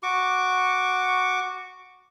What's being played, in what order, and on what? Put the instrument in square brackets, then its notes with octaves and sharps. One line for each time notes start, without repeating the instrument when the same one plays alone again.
[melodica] F#4 C#6 D6